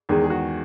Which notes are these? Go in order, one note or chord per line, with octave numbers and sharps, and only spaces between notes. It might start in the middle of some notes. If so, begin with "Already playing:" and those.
E2 D#3 G#3 G#4
G#4
F#4